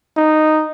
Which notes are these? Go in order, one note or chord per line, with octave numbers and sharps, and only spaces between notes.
D#4